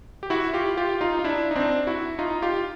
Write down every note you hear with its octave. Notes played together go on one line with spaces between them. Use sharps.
G4
E4 F#4
F4 G4
F4 G4
D#4 F4
D#4
D4 E4
D#4
C4 D4
E4 F#4
D#4 F4
F4 G4